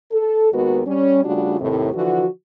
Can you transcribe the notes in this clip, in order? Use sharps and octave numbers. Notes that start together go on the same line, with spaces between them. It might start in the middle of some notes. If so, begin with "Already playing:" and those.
A4
D#2 G#3 B3 F#4 A#4 B4
G3 C#4
C#3 G3 A3 D4 F4 F#4
D#2 A2 C3
D3 E3 F3 F#4